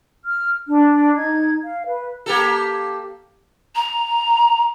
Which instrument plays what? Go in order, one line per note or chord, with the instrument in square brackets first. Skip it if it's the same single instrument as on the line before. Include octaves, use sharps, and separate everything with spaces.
[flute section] F6
D4
D#4 G#6
F5
B4
[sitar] A#3 G4 A4
[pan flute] A#5